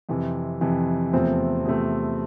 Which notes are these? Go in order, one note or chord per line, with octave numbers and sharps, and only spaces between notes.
F2 C3 E3
F2 C3 E3
E2 C3 F3 A3 C4
E2 C3 F3 A3 C4